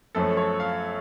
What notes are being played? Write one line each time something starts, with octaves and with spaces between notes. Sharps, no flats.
F#2 F3 A3 C#4 A4
C#5
F5